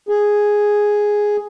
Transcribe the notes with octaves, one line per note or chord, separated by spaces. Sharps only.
G#4